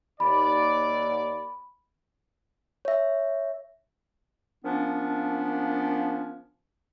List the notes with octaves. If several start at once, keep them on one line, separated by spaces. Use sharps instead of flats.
D#2 D5 B5
C#5 E5
F3 A#3 B3 C#4 D4